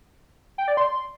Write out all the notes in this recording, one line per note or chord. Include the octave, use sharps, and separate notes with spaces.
G5
D5
C6